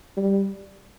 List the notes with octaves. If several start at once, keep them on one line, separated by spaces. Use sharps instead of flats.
G3